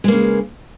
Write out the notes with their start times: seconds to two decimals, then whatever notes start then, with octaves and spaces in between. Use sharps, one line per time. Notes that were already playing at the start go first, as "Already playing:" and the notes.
0.04 G#3
0.08 A#3
0.12 C#3